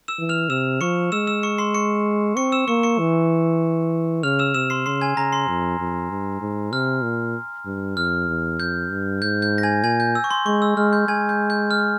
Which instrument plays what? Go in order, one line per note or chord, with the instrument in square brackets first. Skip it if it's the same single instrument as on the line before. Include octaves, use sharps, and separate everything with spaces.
[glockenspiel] E6 E7
[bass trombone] E3
[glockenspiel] F6 F7
[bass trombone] C3 [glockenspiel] E6 E7
[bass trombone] F3 [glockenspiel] C#6 C#7
[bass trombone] G#3 [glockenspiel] E6 E7
[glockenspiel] E6 E7
C#6 C#7
C6 C7
C#6 C#7
[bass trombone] C4 [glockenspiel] C#6 C#7
[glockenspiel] E6 E7
[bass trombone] A#3 [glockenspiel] C#6 C#7
[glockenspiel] C#6 C#7
[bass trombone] E3
[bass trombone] C#3 [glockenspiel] F6 F7
[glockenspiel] E6 E7
[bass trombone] C3 [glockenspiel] E6 E7
[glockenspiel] C6 C7
[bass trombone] C#3 [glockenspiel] C6 C7
[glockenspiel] G#5 G#6
[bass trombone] C#3 [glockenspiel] A#5 A#6
[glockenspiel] C6 C7
[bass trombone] F2
F2
G2
G#2
[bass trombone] C3 [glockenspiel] F6
[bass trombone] A#2
G2
[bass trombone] F2 [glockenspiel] F6
[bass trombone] E2
[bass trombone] F2 [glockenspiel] G6
[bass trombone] G2
[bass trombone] G#2 [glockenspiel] G6
[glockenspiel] G6
A#6
G#5 G#6
[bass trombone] A#2 [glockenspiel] G#5 G#6
[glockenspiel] G6
E6
C#6
C6
[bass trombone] G#3 [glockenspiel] C#6
[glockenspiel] E6
[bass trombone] G#3 [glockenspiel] F6
[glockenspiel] G6
[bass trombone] G#3 [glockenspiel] G#5 G#6
[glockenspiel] G6
G6
F6